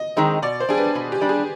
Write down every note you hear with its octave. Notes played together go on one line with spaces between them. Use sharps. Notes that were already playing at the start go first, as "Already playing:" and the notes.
Already playing: D#5
D#3 G#3 C4 D#4
B2 D5
C5
G3 D4 G#4
B4
B2
G4
G3 D4
G#4